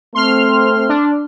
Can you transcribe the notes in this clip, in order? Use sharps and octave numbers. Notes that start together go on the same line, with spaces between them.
A3 C4 C6 F6
D4